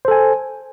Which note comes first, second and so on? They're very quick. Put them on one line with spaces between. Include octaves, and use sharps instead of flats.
C5 A4 G#5